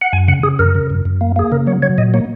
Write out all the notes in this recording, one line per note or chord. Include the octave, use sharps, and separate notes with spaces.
F#5
F#2 G#5
C#3 F#5
C#3 G#4
F#2 A#4
C#3
F#2
F#2
A#3
A#3 G#4
C#3 A#4
F#3 C#5
F#3 C#5
A#2 D#5
A#3 C#5